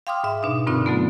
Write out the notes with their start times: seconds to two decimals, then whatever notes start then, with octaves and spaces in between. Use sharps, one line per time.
0.07 F5 G5 C6 D6 D#6 F6
0.24 G#2 E5
0.43 B2 D4 D#4
0.67 G2 A#2 D3 C4 D#4 F4
0.86 D3 F#3 A3 B3